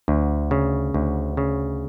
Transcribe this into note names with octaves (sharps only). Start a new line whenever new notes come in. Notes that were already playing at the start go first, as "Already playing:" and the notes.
D2
C#3
D2
C#3